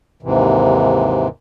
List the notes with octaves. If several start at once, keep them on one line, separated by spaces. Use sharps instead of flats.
D#2 G#2 C3 E3